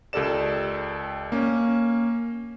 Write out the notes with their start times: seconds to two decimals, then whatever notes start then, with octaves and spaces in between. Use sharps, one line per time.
0.13 C#2 G4 A4 A#4 D5 E7
1.32 A#3 C#4